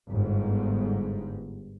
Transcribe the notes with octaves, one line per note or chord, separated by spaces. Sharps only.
G1 G#2